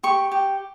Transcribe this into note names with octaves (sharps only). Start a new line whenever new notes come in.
G4 C#6
G4